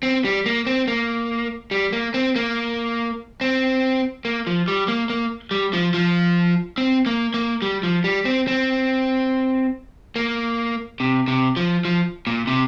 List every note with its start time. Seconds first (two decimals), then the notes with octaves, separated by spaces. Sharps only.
0.03 C4
0.24 G3
0.46 A#3
0.67 C4
0.88 A#3
1.71 G3
1.93 A#3
2.14 C4
2.36 A#3
3.41 C4
4.25 A#3
4.47 F3
4.68 G3
4.88 A#3
5.10 A#3
5.51 G3
5.73 F3
5.94 F3
6.78 C4
7.06 A#3
7.34 A#3
7.62 G3
7.83 F3
8.04 G3
8.25 C4
8.48 C4
10.16 A#3
11.00 C3
11.28 C3
11.56 F3
11.85 F3
12.27 A#2
12.47 C3